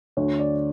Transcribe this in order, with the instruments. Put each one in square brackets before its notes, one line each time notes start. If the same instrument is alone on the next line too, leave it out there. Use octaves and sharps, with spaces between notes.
[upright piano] D2 D3 C#5
D5